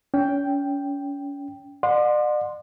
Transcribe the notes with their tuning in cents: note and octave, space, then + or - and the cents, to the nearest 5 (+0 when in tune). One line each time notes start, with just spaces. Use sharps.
C#4 +35 G5 +0
D5 +40 F#5 -35 C6 +0